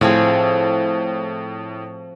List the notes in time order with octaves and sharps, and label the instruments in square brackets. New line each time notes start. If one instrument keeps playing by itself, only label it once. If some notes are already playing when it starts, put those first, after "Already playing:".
[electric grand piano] A2 [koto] F3 C4 G#4